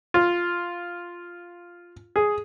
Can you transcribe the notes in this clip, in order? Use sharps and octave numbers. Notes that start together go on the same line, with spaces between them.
F4
G#4